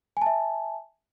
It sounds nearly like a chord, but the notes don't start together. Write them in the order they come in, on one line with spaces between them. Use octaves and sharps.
G#5 A5 E5